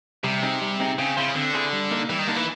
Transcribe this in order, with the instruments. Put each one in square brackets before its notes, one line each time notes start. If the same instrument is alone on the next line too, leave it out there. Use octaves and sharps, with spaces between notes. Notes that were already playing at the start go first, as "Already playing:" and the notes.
[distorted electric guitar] C3 [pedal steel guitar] G3
[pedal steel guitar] C4 D#4 G#4
G3
C4 D#4 G#4
[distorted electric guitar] C#3 [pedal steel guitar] C4
[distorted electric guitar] C#3 [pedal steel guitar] E4 G#4 C5
[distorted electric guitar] D3 [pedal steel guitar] C4
[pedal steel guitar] E4 G#4 C5
G3
A#3 D#4
[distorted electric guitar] E3 [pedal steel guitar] G3
[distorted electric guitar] D#3
[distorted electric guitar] D3 [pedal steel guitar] A#3 D#4
[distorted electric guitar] E3